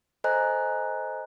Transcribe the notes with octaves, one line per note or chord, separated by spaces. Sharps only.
A4 C5 D#5 G#5 A#5 F#6